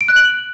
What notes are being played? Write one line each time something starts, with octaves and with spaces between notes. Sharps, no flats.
D7
F#6
F#7